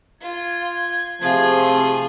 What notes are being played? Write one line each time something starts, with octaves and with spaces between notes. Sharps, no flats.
F4 G#6
C3 F3 A3 F4 G#4